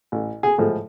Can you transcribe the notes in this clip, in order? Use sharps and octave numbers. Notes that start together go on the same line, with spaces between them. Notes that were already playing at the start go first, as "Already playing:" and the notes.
A1
G#4
A2 F3 G#3